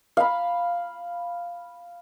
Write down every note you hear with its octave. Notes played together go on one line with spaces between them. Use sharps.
F5 B5